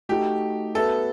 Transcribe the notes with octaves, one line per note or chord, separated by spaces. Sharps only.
A3 D#4 F#4 G4
B3 F#4 A4 B4 E5